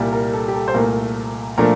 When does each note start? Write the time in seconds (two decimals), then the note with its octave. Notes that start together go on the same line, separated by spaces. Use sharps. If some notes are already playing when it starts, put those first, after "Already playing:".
Already playing: C2 A#2 G3
0.12 A#4
0.33 A4
0.48 G4
0.54 A4
0.68 C5
0.74 C2 A#2 A3 A#4
1.58 A#2 F3 A3 D4 A#4